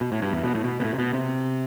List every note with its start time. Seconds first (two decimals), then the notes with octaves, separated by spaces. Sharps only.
0.01 B2
0.12 A2
0.22 G2
0.33 E2
0.43 B2
0.55 A2
0.64 B2
0.80 B2
0.84 A2
0.94 C3
0.98 B2
1.13 C3